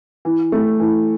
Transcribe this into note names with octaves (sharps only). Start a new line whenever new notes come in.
E3
A3
E3